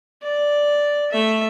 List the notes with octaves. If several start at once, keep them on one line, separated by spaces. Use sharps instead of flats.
D5
A3 E5